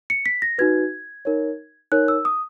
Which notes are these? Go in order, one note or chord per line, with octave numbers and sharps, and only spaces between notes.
C#7
B6
A#6
D#4 F#4 B4 G#6
D#4 A#4 C#5
D#4 A#4 C#5 F#6
E6
D#6